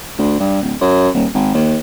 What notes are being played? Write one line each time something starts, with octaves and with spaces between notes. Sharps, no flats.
D2
G2
D1
F#2
D#1
G#1
D#2